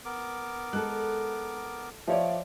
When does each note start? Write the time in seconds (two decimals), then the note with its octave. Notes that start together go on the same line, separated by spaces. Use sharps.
0.05 B3 A#4 D6
0.73 G#3 A4 F#6
2.08 F3 A3 C#5 D5 E5 F5